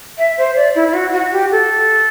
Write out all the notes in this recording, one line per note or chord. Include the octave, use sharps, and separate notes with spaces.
E5
C5
D5
E4
E4
F#4
F#4
G4
A4